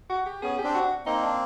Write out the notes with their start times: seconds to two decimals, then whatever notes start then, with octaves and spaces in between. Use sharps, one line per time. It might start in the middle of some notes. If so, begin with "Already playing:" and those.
0.10 F#4
0.26 G4
0.42 B3 C#4 G#4
0.58 G4
0.64 C4 D4
0.74 F#4
1.06 A#3 C4 D#4
1.23 D4